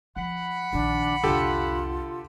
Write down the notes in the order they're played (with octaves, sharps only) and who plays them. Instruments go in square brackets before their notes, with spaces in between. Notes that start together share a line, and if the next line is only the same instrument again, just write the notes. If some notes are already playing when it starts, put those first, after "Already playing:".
[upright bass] F3 [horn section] F#5 B5
[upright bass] A#1 D#3 [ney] D4
[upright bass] C2 F2 [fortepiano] D3 G4 A4 [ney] F4